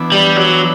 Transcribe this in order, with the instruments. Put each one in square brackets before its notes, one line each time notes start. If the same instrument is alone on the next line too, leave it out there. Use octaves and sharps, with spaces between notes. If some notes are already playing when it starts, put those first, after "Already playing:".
Already playing: [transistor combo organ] E3 B3 D4
[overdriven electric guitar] G3
F#3